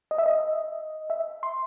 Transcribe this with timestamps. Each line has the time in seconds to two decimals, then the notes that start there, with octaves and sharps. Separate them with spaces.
0.11 D#5
0.18 E5
0.26 D#5
1.10 E5
1.43 C6